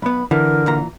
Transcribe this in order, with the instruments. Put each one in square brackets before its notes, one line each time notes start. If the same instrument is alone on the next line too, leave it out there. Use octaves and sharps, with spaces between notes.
[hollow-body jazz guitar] B1 B3 [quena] B5
[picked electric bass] D3 [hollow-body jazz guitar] E3 [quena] A#4
[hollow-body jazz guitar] A#2 E3 A#5